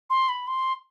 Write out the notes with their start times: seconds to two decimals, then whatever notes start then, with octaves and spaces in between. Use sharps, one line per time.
0.10 C6
0.29 B5
0.47 C6